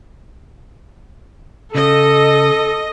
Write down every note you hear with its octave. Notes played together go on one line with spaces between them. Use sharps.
C#3 A4 D#5